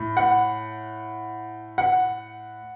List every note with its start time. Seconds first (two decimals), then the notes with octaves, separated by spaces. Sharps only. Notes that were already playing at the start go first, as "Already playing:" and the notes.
Already playing: A2
0.17 F#5
1.78 F#5